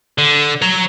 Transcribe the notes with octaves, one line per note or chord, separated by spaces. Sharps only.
D3
C#5 A#5